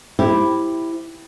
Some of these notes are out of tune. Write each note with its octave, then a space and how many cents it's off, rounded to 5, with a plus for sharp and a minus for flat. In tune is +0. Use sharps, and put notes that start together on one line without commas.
E4 +0 G4 +0 C5 -5